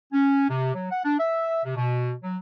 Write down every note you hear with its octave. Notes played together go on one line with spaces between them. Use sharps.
C#4
C3
F#3
F#5
D4
E5
C3
B2
F#3